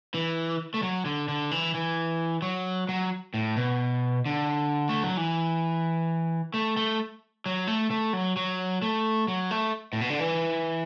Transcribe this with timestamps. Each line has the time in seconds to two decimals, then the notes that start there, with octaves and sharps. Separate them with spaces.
0.14 E3
0.74 A3
0.83 F#3
1.05 D3
1.28 D3
1.51 E3
1.74 E3
2.42 F#3
2.89 F#3
3.34 A2
3.57 B2
4.26 D3
4.89 A3
5.03 F#3
5.17 E3
6.54 A3
6.77 A3
7.46 F#3
7.67 A3
7.91 A3
8.13 F#3
8.36 F#3
8.82 A3
9.28 F#3
9.51 A3
9.93 A2
10.01 B2
10.10 D3
10.20 E3